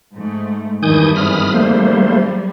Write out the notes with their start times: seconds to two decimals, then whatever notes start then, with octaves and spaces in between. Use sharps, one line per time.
0.14 G#2 A3
0.83 E2 G2 D#3 E3 G#5 D#6 G6
1.15 G#1 B5 D#6 F6
1.54 F#3 G3 A3 A#3 C5